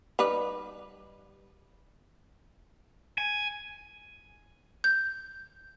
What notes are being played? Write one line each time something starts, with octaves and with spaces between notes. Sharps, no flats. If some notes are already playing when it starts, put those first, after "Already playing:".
G3 D#4 B4
G#5
G6